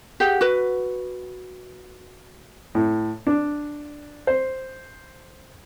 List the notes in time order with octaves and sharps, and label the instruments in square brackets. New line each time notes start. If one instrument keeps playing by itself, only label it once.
[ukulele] G4 G#4 F#5
F#4 B4
[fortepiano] A2
D4
C5